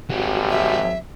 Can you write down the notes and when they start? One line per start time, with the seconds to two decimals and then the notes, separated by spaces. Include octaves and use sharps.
0.10 G#1 F#3 G3
0.50 E5